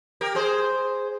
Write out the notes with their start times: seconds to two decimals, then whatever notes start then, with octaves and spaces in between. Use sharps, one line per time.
0.21 G4 A#4
0.35 G#4 C5